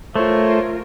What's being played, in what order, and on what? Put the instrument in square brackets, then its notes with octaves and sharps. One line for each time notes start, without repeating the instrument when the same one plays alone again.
[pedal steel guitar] A3 [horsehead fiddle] F4 A#4 [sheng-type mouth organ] C5 C#5